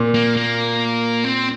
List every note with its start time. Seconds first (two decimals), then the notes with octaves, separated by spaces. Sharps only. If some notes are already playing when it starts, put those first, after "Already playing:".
Already playing: A#2
0.14 A#3
0.37 A#3
1.24 C4